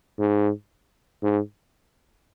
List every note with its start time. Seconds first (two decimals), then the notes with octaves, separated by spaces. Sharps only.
0.19 G#2
1.23 G#2